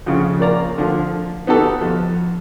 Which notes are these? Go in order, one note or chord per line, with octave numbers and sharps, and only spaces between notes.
F2 C#3
A#2 A#3 D5 A#5
D3 F3
B3 D#4 F#4 G4 A4
F2